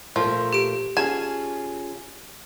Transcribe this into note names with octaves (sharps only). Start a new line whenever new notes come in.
A#2 F3 A3 A#4
G4 D7
C#4 F4 G#4 G#5 A5